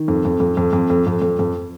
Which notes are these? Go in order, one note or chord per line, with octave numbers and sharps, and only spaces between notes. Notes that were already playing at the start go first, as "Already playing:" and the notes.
Already playing: D#3
F2
F2
F2
F2
F2
F2
F2
F2
F2